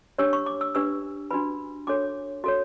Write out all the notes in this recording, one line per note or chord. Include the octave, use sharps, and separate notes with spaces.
D4 G4 C#5 E6
C#6
D6
E6
D4 G4 B4 E6
D4 F#4 B4 B5
D4 F#4 A4 C#5 D6
F#4 A4 C#5